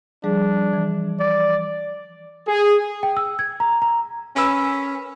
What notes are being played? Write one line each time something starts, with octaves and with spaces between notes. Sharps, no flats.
F3 G3 D4 G#4
E3
D5
G#4
G5
E6
G#6
A#5
A#5
C#4 A#4 B4 E6